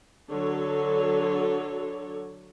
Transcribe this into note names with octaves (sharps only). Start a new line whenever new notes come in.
D3 F#3 A4 C#5